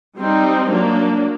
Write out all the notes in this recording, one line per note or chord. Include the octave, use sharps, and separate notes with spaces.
G3 C4 D#4
F#3 A#3 D4